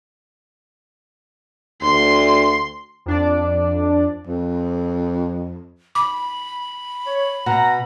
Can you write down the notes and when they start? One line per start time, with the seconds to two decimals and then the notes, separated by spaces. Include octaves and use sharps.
1.82 D2 C6
3.06 F2 D4 D5
4.27 F2
5.95 B5 D6
7.06 C#5
7.46 B2 F#5 A#5